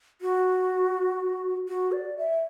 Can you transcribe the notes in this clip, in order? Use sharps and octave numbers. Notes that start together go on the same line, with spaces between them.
F#4
F#4
D5
E5